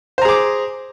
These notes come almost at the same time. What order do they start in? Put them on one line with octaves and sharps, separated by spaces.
C5 A#5 G#4 D6